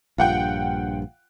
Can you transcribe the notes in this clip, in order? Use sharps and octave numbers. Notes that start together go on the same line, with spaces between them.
A#1 G2 F4 F#5 G5